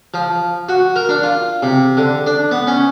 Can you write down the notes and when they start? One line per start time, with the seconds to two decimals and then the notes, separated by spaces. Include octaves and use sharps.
0.14 F3
0.69 F#4
0.96 A#4
1.09 D4
1.23 F4
1.63 C3
1.97 D3
2.26 D4
2.51 B3
2.67 C#4